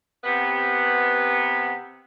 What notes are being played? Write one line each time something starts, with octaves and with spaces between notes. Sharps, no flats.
C3 B3